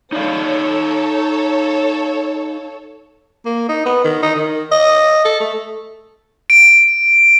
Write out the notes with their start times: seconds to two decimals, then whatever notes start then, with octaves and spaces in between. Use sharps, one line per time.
0.12 D#4 A4 C#5 D5 F5
3.45 A#3
3.69 D#4
3.86 B3
4.04 D#3
4.23 D#4
4.35 D#3
4.72 D#5
5.25 A4
5.40 A3
6.50 D7